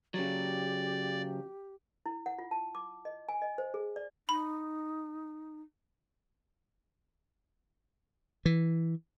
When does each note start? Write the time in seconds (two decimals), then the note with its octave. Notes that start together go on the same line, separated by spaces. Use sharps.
0.14 C#3 F#3 G4 D5
2.06 E4
2.26 F#5
2.39 F4
2.51 A5
2.75 D6
3.05 D#5
3.29 G#5
3.42 D#5
3.58 C5
3.74 G#4
3.96 D5
4.29 D#4 B5
8.46 E3